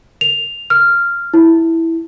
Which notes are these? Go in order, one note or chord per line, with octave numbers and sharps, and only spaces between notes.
F7
F6
E4